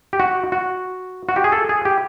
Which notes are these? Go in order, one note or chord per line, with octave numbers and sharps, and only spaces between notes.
G4
F#4
F#4
F#4
G4
G#4
A4
G#4
G4